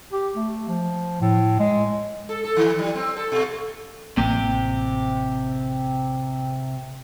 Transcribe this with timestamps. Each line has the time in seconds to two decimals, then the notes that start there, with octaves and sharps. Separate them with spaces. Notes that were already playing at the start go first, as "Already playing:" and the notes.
0.13 G4
0.36 A3
0.68 F3
1.21 A2
1.59 G#3
2.29 A4
2.44 A4
2.56 D#3
2.79 G3
2.95 C4
3.16 A4
3.32 B2
4.17 A1 C3 A#3 G4